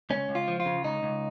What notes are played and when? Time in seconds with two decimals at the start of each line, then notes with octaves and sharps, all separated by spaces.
0.10 C#2 C#4
0.29 C#2
0.35 F4
0.48 F3
0.60 F4
0.66 C#3
0.84 C#2 D#4
1.03 C#2